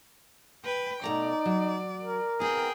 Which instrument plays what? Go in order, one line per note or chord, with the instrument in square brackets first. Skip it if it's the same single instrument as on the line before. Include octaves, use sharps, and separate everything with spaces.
[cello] B4 G5
[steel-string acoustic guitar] B2 A3 A#5 [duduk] D#4 [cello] D5
[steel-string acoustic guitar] F#3
[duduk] A#4
[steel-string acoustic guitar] B3 C4 E4 [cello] G#4 G5